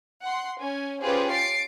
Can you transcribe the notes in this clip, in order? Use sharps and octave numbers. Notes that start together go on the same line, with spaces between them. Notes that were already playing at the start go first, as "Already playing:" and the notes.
F#5 C6
C#4 G#5
C#4 F4 G4 G#4 B4 C5
A6 C7 D7